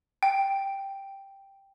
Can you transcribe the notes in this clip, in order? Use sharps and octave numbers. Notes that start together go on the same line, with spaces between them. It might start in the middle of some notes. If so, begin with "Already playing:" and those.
G5